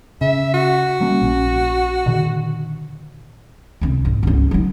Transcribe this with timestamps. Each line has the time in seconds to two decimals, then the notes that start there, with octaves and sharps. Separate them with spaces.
0.21 C#3 E5
0.53 F#4
1.01 G3 A#3 C#4
1.22 A#1 C#4
2.06 A#2 D3 D#3
3.81 C2 E4
4.05 G#2
4.23 C#2 F#2
4.51 F#3 D#4